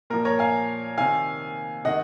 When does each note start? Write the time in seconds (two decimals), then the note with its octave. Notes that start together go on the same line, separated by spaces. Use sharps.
0.10 A#2 F3 A#4
0.25 A#4 C#5
0.39 F5 G#5
0.98 C3 D#3 F5 G#5
1.85 C3 D#3 D#5 F#5